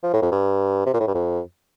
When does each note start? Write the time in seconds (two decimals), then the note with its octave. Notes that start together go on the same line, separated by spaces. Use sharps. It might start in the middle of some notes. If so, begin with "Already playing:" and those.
0.03 F3
0.13 A2
0.22 F2
0.32 G2
0.86 C3
0.94 A#2
1.00 A2
1.07 G2
1.14 F2